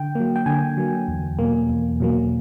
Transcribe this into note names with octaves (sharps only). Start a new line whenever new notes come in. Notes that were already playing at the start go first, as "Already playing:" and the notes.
Already playing: D3 G5
F#3 A#3
G5
D3 G#5
F#3 A#3
E2
B2 F#3 A#3
E2
B2 F#3 A#3